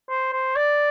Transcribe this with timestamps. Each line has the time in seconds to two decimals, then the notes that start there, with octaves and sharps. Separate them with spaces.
0.09 C5
0.33 C5
0.56 D5